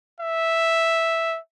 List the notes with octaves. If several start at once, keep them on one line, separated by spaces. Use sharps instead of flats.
E5